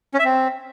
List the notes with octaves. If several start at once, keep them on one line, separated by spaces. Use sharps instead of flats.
C#4
E5
C4